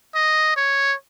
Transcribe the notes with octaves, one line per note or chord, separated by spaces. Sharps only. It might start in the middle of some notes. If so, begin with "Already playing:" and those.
D#5
C#5